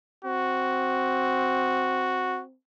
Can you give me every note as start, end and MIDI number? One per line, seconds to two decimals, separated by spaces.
0.25 2.55 60
0.25 2.42 66